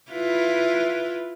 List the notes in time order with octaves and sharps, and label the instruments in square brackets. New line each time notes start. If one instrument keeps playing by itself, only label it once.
[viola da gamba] E4 F4 B4